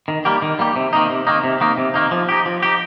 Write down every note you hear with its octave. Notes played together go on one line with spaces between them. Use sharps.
D#3
G3 A#3 G4
D#3
G3 A#3 G4
C3
D#3 A#3 D#4
C3
D#3 A#3 D#4
C3
D#3 A#3 D#4
C3
D#3 A#3 D#4
F3
D#4 G4
F3
D#4 G4